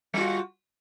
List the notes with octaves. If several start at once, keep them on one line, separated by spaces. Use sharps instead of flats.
G3 F4 F#4